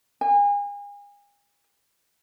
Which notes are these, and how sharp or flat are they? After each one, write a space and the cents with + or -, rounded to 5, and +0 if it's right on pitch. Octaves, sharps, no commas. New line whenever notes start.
G#5 -35